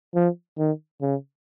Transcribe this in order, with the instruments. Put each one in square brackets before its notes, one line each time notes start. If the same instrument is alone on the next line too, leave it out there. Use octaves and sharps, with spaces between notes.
[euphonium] F3
D#3
C#3